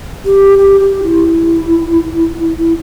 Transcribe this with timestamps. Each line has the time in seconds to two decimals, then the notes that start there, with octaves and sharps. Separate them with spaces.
0.25 G4
0.59 G4
0.80 G4
1.03 E4
2.58 E4